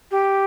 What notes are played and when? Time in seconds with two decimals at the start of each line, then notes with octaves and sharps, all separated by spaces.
0.11 G4